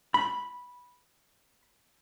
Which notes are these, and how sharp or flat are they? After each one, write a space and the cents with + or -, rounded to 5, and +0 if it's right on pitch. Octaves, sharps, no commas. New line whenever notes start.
B5 -5